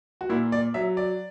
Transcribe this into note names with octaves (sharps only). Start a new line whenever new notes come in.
F#4
A#2 E4
D5
F#3 E5
D5